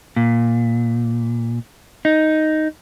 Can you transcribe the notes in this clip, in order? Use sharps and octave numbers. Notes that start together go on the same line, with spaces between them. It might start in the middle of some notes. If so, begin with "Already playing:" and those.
A#2
D#4